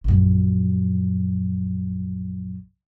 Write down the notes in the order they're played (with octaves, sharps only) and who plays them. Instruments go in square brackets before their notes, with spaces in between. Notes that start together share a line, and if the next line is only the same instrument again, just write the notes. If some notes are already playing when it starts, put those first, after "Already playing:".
[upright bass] A#1 F#2